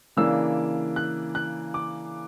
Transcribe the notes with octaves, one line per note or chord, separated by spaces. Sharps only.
C#3 E3 A#3 D4 E6
F#6
F#6
D6